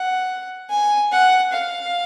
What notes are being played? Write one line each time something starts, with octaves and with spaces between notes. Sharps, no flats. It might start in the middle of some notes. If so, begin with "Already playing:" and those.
Already playing: F#5
G#5
F#5
F5